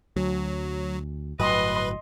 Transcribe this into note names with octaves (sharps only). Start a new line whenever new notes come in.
D2 F#3
G1 A2 F#3 B4 D#5 C6